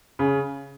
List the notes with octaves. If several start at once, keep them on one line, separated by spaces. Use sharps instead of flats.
C#3